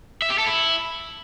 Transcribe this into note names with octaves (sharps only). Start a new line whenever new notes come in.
E5
G4
A4
E4